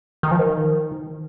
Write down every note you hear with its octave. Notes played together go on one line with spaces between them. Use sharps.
D#3
F3
D#3